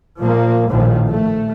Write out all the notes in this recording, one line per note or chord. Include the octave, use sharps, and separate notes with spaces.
A#2 F3 A#3
A#1 A2 D#3 F3
A3